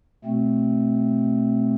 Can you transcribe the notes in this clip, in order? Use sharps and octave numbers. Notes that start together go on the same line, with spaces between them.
B2 A3 C4